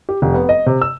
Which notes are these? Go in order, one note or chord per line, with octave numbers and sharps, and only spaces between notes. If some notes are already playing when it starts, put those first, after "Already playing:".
G4
F1
B3
D#5
C3
E6